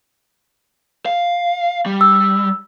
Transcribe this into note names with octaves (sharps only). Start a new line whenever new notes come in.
F5
G3
E6